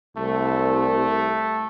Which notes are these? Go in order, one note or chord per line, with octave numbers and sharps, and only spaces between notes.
C2 A3